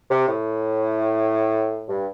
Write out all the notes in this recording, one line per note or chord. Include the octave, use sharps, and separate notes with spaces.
C3
A2
G2